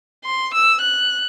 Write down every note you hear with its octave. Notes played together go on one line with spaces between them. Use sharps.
C6
E6
F#6